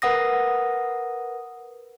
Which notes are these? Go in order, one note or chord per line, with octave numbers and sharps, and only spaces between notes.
A#4 B4 F#5 D#6 A#6